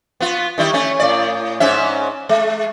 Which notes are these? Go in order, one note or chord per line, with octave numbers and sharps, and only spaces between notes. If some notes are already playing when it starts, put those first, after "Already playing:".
B3 F4
D#3 G3 E4
A3 C#4
A2 D5
G#2 C#4 E5
G#3